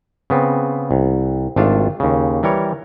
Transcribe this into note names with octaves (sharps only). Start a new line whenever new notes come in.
C#3 B3 C4
C2
G#1 A3 D4 F4 A5
D#2 C#3
E3 G3 A#4 C#5